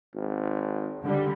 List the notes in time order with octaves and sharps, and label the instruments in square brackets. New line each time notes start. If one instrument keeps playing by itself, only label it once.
[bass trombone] G#1
[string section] D3 G3